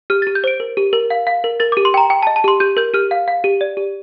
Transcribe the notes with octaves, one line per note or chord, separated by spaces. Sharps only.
G4 F6
G4 A6
G6
C5 D7
A#4
G4
A#4
F5
F5
A#4
A#4 A6
G4 D6
C6
G5 A#5
G5
D#5 A5
A5
G4 C6
G4 G6
A#4 G6
G4 F6
F5
F5
G4
D5
G4